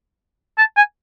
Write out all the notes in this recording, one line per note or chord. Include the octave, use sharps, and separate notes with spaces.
A5
G#5